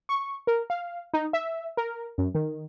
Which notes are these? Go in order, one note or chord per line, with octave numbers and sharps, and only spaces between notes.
C#6
A#4
F5
D#4
E5
A#4
F#2
D#3